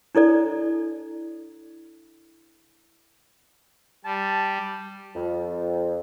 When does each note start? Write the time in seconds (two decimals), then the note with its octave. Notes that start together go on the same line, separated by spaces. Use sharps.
0.15 D4 E4 A4 D5
4.05 G3 A5
5.15 F2